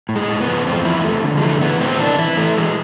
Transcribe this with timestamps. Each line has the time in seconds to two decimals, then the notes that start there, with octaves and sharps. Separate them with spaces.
0.09 A2
0.16 G#3
0.28 A2
0.41 B3
0.48 F3
0.66 E2 C4
0.85 F3 E4
1.04 F3 A3
1.23 D3
1.37 G#3
1.42 E3 A3
1.61 E3 B3
1.80 A2 C4
2.00 E3 D4
2.18 E3 E4
2.37 E3 A3
2.57 E3 G#3